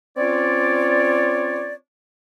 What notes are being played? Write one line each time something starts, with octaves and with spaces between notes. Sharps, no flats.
C4 C#4 F4 C#5 D5